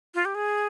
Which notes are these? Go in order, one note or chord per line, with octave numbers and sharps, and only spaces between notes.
F4
G4
G#4